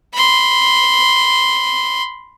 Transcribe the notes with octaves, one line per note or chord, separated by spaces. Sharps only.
B5 C6